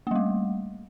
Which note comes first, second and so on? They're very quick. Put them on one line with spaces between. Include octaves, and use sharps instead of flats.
A#3 G3 A3